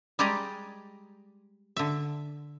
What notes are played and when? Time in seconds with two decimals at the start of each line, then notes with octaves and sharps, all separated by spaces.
0.19 G3 G#3 G4 G#4 D5 A#5
1.77 D3 E5